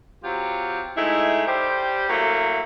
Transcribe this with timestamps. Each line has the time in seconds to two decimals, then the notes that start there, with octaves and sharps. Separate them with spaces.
0.23 F#3 C4 F4 G4
0.96 G#3 A3 D#4 E4
1.47 G3 G4 C5
2.10 F#3 A3 A#3 E4